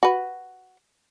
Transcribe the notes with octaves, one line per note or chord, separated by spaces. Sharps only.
F#4 B4